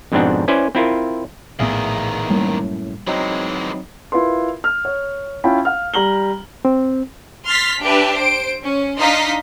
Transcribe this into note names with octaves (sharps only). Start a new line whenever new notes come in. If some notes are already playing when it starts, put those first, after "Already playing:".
F2 G#2 B2 C4 D4 F#5
C#4 E4 B4 C5 D5
C4 E4 F4 A#4
A#1 E2 A2 D#3 B3 G#4 E5 F5
F#2 A2 G3 A#3
E3 F#3 G#3 C4 D#4
E4 F4 A#4 B4 C6
F6
C#5
C#4 E4 F4 G5 A5 B5
F5 F6
G3 A#5 F#7 G7
C4
C6 F6 A6 B6
D4 G4 B4 E5
C5 D7
C#4
D4 D#4 D#5 F5 C6 B6